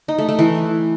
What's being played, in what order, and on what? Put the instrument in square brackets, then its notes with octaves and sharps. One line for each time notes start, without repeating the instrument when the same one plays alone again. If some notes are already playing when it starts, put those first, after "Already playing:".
[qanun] D#4
A3
A3
E3